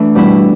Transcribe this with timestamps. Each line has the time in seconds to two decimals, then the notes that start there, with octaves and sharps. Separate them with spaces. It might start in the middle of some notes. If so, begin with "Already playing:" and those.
Already playing: E3 A3 D4
0.15 B2 G3 B3 E4